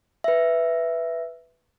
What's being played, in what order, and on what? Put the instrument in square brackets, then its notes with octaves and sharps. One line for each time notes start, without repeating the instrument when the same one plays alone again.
[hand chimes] B4 E5